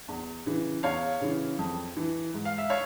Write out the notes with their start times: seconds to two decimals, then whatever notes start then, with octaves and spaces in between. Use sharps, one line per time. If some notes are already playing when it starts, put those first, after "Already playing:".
0.09 E2
0.46 C#3 E3
0.83 E2 C#5 F5
1.21 C#3 E3
1.59 F2
1.97 E3
2.34 G#2
2.45 F5
2.58 E5
2.69 C#5 F5